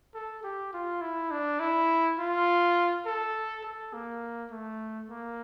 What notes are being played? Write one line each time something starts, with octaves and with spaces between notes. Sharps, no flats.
A4
G4
F4
E4
D4
E4
F4
A4
A4
A#3
A3
A#3